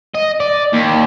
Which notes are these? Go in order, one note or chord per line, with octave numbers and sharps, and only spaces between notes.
D#5
D5
D#2